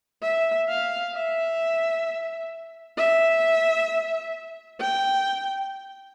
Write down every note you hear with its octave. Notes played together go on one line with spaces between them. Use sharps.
E5
F5
E5
E5
G5